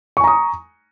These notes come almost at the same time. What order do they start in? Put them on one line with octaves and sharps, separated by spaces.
C#6 G#5 A#5 D#6